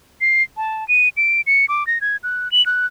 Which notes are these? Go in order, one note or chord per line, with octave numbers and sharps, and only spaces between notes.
C7
A5
D#7
D7
C#7
D6
A#6
G#6
F#6
F#7
F#6